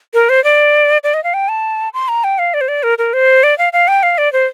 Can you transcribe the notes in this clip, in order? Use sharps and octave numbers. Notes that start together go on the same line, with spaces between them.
A#4
C5
D5
D5
D#5
F5
G5
A5
C6
A#5
G5
F5
D5
C5
D5
A#4
A#4
C5
D5
F5
F5
G5
F5
D5
C5